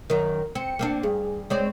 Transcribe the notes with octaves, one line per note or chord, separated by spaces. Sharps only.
F#2 D#3 A#4
C4 C#7
A#3 C4 D4
G2 G#4
G#3 C4 C#5 D5